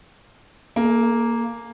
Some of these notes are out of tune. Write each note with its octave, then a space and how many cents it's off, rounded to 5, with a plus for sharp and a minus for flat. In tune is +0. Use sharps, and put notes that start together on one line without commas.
A#3 +0 A4 -45